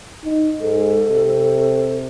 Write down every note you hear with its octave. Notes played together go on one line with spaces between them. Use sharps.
D#4
G#2 A4
C3